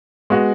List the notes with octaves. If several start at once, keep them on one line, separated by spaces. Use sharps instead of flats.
G#3 B3 F#4